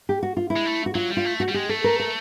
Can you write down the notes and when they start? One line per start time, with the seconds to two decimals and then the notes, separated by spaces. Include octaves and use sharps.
0.09 G4
0.23 F#4
0.37 F4
0.50 E4
0.56 G#3
0.65 A3
0.86 F#4
0.95 F#3 F4
1.10 G3
1.17 F4
1.25 A3
1.40 F#4
1.48 G3
1.54 G#3 G4
1.69 A3 A4
1.84 A#4
2.00 A#4